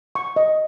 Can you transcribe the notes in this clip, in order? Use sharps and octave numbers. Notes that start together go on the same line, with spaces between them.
C#6
D#5